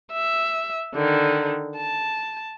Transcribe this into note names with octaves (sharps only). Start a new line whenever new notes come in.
E5
D3 D#3
A5